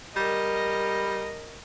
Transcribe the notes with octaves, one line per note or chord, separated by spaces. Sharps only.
G3 A#4 D#5